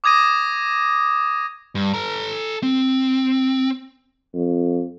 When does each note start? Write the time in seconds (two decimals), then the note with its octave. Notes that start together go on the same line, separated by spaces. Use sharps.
0.04 D6 D#6 G#6 A#6 D#7
1.75 G2
1.94 A4 A#5
2.63 C4
4.34 F2